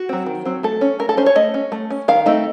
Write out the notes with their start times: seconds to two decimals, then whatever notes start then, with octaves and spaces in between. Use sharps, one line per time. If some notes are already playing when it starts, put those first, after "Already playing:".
Already playing: F#4
0.09 F#3 C4
0.26 D#3
0.45 F#3 C4
0.63 A3 A4
0.81 C#4
0.99 A3 A#4
1.09 A4
1.17 C#4 C5
1.26 C#5
1.35 A3 D#5
1.54 C#4
1.72 A3
1.90 C#4
2.08 D#3 F5
2.26 A3 C4 D#4